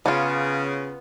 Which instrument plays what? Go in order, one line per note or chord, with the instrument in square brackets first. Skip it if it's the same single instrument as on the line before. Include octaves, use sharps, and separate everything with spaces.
[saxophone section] C#3 [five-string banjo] B3 F4